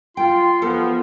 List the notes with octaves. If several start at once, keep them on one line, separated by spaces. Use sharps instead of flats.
F4 G5 C6
F3 B3 A4